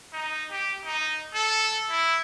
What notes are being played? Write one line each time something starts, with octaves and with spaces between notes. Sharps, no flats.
D#4
G4
D#4
A4
E4